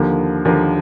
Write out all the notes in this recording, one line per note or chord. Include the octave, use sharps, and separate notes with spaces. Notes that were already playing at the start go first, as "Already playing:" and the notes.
Already playing: D#2 D3 F3 A#3
D#2 D3 F3 A#3